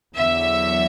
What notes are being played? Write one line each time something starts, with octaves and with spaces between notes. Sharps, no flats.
E2 D3 F#3 E5